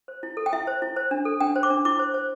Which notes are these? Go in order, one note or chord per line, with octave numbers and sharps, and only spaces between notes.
C5
E4
A4
G5
E4 E5
C5
E4
C5
D4
A4
D4 G5
C5
D6
D4
E4 D6
C5
C5